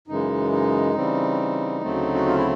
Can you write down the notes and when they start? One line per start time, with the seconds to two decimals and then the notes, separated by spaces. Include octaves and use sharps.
0.08 F#2 C#3 E3 G#3 D#4
0.52 D#4
0.94 C#3 E3 G3 C4
1.81 D2 C#3 F#3 A3 C4
2.15 F#4
2.26 F4
2.36 E4